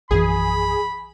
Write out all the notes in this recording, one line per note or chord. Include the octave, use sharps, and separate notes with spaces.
A#1 F#2 E3 G#4 B5